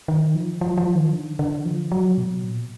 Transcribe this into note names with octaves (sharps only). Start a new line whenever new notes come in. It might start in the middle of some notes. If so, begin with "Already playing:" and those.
D#3
F3
F3
F3
D#3
D3
D3
F3
F#3
B2
A#2